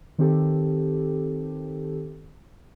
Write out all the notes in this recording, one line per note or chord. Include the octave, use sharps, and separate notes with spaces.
D#3 C4 G4 A4